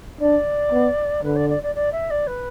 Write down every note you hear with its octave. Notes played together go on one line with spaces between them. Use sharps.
D4 D5
B3
D3 B4
D5
D5
D5
D5
E5
D5
B4